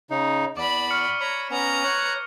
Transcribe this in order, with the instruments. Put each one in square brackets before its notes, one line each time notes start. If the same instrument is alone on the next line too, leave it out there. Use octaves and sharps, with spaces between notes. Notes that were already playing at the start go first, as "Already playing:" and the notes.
[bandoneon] C#3 D#4
[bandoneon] E2 [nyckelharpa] D5 B5 [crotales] D6
[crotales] C#6 F6 C#7
[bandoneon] C#5 B5 [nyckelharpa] A#5
[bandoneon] B3 C#4 [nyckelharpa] B4 A#5
[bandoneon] C#5 F#6